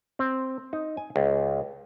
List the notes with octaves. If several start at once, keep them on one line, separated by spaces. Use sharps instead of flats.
C4
D#4
G#5
C#2